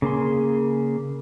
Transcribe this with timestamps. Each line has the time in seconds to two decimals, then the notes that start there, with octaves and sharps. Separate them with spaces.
0.02 C#3 A#3 G#4 C6